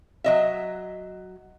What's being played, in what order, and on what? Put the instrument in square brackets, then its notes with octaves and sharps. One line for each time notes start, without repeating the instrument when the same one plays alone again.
[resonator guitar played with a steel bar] F#3 D#5 E5